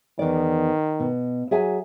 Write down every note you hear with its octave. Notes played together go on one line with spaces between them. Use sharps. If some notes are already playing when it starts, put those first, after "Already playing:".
E2 D#3 D5
B2
F#3 G#4 E5 G#5